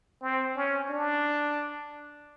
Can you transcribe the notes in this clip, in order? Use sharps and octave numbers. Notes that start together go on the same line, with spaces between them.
C4
C#4
D4